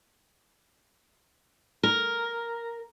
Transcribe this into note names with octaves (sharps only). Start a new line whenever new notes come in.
A#4